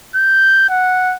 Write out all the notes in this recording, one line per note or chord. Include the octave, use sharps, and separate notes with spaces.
G6
F#5